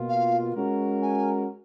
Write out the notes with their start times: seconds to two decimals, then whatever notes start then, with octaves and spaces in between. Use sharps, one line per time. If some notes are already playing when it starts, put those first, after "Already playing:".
Already playing: B2 A#3 F4
0.09 F5
0.55 G#3 C#4 F#4 A#4
1.02 G#5